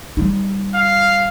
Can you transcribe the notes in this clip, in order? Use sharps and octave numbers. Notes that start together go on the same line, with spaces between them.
G3 D#4
F5